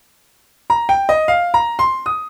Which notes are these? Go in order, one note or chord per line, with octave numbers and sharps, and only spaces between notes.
A#5
G5
D#5
F5
A#5
C6
D#6